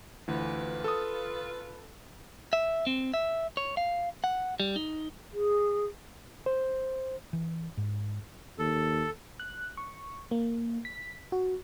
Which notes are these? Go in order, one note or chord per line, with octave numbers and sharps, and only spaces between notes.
D2 E3 F4 B4
A4 D#6
E5
C4
E5
C#5
F5
F#5
G3
D#4
G#4
C5
E3
G#2
D#2 A4
F#6
C#6
A#3
B6
F#4